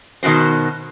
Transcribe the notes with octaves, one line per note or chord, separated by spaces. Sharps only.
B2 D#3 F3 F#4 C5